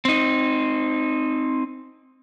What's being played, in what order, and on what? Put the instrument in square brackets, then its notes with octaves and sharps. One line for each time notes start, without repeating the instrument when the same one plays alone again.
[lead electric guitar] C4 D#4